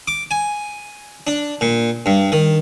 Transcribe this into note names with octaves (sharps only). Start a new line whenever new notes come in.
D6
G#5
D4
A#2
G2
D#3